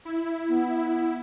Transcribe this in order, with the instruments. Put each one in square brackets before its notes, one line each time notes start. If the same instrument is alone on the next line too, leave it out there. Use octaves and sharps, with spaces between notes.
[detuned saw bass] E4
[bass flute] B3